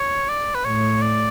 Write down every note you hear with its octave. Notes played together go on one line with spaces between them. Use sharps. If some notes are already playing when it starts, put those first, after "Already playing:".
Already playing: C#5
D5
B4
A2 C#5
D5